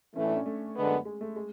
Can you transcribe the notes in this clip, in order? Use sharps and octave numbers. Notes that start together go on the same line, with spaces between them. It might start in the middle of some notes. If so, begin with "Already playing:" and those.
A2 E3 A3 C#4
D4
C#4
A3
F#2 D3 G#3 B3
G#3
A3
G#3